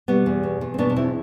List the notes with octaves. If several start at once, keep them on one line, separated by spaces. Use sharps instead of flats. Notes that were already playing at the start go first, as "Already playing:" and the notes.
B2 G3 B3
E2
B2
E2
C4
B2 B3 D4
D4
E2 C4 E4